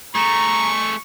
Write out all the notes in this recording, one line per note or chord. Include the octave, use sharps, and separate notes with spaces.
A3 G#4 A#5 C#6